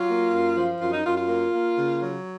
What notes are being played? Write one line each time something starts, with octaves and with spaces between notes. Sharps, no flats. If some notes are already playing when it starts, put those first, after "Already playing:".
Already playing: F#3 F4
A#3
F#2
F3
F#2 F4
D#4
F#2 F4
F4
A#3
A#3
C#3
F#3